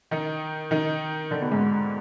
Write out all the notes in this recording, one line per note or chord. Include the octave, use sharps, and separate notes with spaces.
D#3 D#4
D#3 D#4
D3 D4
B2 B3
G#2 G#3